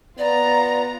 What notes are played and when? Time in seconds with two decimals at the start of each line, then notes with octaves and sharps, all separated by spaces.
0.18 B3 F4 D5 A#5 A#6